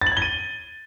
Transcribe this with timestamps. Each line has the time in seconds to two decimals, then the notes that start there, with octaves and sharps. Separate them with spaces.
0.01 A6
0.07 F#7
0.12 G#6
0.17 G7
0.22 D#7